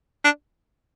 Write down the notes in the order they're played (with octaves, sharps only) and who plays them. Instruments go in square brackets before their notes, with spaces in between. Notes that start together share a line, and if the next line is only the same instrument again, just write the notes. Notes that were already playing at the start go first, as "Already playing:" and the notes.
[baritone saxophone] D4